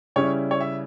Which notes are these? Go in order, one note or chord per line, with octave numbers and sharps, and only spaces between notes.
C#3 G3 C#4 E4 C#5
C#5
E5